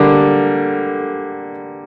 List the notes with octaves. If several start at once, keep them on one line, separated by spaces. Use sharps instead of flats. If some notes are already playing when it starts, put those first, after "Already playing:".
Already playing: D3 G3 A#3